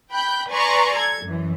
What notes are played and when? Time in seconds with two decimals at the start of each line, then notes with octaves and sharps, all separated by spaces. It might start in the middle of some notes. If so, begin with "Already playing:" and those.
0.12 G5 B5 F#6 G6
0.49 B4 D5 G#5 A#5 C6 C#6
0.95 A4 G#6
1.25 F#2 E3